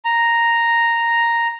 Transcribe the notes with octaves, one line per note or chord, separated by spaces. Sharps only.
A#5